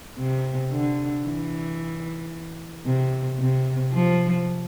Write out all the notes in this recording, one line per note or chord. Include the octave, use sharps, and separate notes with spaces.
C3
D3
E3
C3
C3
F3